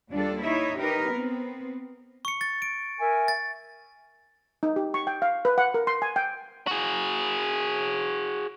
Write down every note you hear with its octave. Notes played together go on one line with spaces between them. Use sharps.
D#2 G3 D4 F4 A4
D#4 E4 C#5 E5
D#4 G4 A#4 B4
B3 C4
C#6 C#7
A6
D7
A#4 E5 G#5
A6
D#4
G4
C#6
G5
F5
B4
F#5
A#4
C6
G#5
G5
F#4 G#4